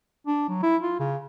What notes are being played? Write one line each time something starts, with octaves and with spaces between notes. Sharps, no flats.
D4
F#3
E4
F4
C#3